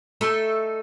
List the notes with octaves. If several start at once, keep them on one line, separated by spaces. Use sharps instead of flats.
A3 D#4 A4